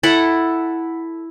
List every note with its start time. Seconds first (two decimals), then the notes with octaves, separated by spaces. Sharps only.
0.03 E4 A4 F#5